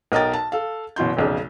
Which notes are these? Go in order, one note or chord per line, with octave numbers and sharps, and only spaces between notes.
B1 A#4 D#5 G5 A6
A5
A4 F5
F#1 B2 E3 C6 G6
F1 B1 C#3